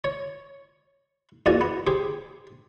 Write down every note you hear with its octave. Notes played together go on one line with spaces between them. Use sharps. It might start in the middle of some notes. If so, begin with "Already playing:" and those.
C#5
E2 A#2 F#4 D5 G#5
B3
G4 G#4 C5